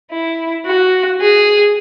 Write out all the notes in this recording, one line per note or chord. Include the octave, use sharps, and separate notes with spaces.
E4
F#4
G#4